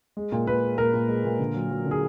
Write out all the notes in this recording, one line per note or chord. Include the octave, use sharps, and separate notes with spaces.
G#3
A#2
A#2 B4
G#3
A#2 A#4
A#2
G#3
A#2
D3
F#3
F#3
D3
G#4